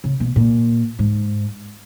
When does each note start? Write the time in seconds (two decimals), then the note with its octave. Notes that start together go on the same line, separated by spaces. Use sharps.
0.04 C#3
0.20 B2
0.36 A#2
0.99 G#2